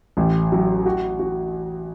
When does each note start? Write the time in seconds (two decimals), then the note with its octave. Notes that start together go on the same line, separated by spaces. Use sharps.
0.17 A1
0.52 F#3
0.86 F#4
1.19 F#4